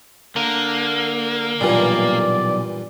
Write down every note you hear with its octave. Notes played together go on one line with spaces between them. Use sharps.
D3 A#3
B1 G2 A#2 E3 D5